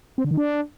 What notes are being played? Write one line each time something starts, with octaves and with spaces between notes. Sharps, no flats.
C4
D3
D#3
D4